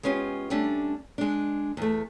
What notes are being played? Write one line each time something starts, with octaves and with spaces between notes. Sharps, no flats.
G#3 B3 C#4 F4 G4
G3 A3 C#4 D4
G#3 D4
E2 A3